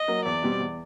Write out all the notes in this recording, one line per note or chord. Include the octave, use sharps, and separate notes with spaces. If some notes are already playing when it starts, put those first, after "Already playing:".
Already playing: D#5
F#3 A#3
E2 D5
B2 G3 C4
E2